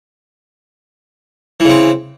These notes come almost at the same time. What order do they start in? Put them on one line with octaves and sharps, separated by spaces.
E3 C#3 C4